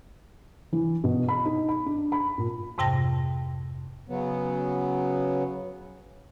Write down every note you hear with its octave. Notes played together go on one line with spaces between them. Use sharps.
E3
B2
B5
D#4
B5
D4
B5
A#2
F2 G#2 C3 G5 A5 A#6
C#3 F#3 B3